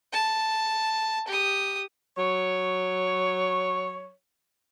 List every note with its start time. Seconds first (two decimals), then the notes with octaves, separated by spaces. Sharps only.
0.13 A5
1.28 G4 D#6
2.17 F#3 C#5